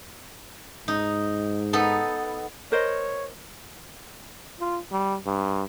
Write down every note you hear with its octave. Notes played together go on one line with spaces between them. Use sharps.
G#2 D#4
B3 D#4 A4
A#4 C5 C#5 D#5
F4
G3
G2